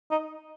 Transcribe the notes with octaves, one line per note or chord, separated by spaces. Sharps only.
D#4